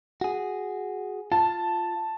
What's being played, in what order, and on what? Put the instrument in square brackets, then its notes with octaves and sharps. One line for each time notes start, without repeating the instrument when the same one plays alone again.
[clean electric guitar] F#4 G#4
[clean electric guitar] F4 [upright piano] A5